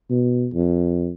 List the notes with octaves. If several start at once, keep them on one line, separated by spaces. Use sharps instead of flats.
B2
F2